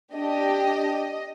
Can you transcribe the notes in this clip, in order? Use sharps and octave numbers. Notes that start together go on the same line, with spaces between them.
D4 G4 D#5